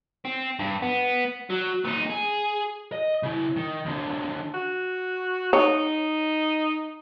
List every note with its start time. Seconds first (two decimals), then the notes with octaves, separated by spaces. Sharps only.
0.25 C4
0.60 G2
0.82 B3
1.50 F#3
1.85 A#2 D#4
2.10 G#4
2.92 D#5
3.23 C#3 E4
3.57 D#3
3.86 D#2 D3
4.54 F#4
5.53 D#4 C#5